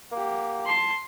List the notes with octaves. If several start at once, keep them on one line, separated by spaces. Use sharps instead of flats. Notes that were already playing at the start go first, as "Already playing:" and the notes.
A#3 G4 F#5
A5 C6